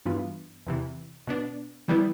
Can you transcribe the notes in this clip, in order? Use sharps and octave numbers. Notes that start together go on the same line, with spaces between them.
G2 E3 B3 F4
E2 C3 E3
B2 B3 D4
E3 G3 B3 E4